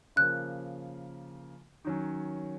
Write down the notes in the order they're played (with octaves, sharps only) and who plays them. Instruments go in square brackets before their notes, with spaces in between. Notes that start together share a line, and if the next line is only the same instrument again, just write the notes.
[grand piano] C#3 F3 A#3 [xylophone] F#6
[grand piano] D#3 F#3 C#4